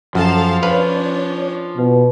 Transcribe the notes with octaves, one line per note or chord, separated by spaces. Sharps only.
F#2 F3 A4 F5 A5
C#4 D4 B4 C#5 F5
B2